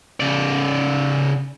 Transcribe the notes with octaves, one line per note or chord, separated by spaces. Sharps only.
C#3 D5